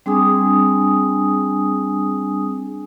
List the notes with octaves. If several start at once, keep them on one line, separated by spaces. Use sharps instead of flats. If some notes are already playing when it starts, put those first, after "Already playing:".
G3 C4 D4 G#4 G#5 D#6